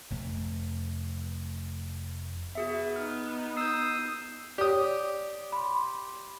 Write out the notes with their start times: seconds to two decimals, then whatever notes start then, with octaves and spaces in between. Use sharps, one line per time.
0.10 F1 F2 A3
2.55 B3 F#4 G#4 E5
2.96 D#4 F6
3.57 D#6 E6 G6 C7
4.58 G4 C#5 D5 D#6
5.52 B5 C6